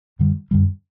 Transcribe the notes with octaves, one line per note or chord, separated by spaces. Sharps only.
F#2 D3 G3
F#2 D3 G3